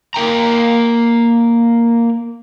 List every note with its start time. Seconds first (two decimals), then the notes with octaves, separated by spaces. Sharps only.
0.14 A#3 A#4 G5 A#5